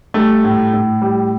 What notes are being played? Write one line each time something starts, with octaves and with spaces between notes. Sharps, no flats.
G3 A3
A2
A2
G3